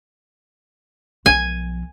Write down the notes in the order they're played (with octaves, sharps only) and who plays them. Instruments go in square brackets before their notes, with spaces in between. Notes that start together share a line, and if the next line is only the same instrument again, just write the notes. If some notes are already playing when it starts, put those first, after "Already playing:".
[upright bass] B1 F3 [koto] G#5